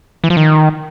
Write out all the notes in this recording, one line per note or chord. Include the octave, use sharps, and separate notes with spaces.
E3
F3
D#3